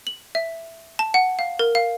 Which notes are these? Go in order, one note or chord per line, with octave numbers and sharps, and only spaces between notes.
F#7
E5
A5
F#5
F5
A#4
F5